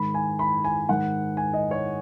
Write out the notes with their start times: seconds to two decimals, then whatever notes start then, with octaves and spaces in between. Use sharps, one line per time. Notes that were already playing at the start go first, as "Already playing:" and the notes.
Already playing: G#2 D#3 B5
0.14 G#5
0.39 B5
0.64 G#5
0.89 G#2 D#3 F#5
1.37 G#5
1.53 D#5
1.71 C#5